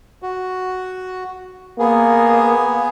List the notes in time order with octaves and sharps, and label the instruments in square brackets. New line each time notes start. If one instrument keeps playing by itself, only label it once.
[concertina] F#4
[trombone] A#3 [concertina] B3 G#4